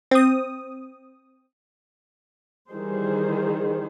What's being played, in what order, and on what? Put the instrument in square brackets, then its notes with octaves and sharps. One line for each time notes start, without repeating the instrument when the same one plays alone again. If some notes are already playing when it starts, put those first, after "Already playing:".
[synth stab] C4 D#6
[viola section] D#3 E3 G3 G#4 C5